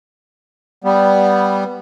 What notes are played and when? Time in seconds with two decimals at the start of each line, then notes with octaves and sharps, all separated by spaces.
0.84 G3 B3